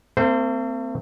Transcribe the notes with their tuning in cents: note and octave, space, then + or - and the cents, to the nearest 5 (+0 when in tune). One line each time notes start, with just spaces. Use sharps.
A3 +45 C4 -25 C5 -20